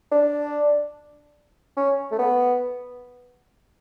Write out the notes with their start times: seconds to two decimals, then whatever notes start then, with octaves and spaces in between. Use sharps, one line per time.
0.11 D4
1.77 C#4
2.12 A3
2.19 B3